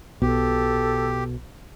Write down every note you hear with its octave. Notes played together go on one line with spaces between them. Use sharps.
B1 B2 G4 A4